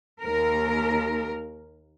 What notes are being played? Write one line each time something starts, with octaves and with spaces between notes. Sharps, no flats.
D#2 A#4